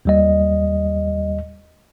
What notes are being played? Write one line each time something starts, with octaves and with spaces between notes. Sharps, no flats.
D#2 G3 D#5